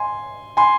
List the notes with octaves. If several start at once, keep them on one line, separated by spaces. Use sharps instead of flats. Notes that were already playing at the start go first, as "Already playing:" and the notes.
Already playing: G#5 C6
G#5 C6